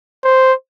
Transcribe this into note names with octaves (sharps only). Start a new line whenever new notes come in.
C5